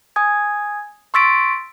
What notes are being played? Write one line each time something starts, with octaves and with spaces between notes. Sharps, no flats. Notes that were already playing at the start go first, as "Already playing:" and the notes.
G#5 D#6 G#6
C6 C#6 E6 A6 B6 D7